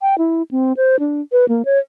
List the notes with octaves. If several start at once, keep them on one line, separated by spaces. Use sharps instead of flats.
G5
E4
C4
C5
D4
B4
A#3
C#5